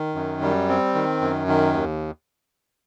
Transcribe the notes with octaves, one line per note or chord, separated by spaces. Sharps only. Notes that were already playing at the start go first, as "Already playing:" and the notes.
Already playing: D#3
F#2
G3
C4
D#3
F#2
D#3
D#2